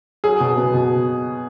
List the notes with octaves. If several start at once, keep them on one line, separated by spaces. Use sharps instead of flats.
F#3 G#4
B2
B3
B2